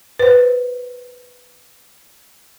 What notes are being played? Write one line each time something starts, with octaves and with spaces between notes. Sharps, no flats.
B4 C5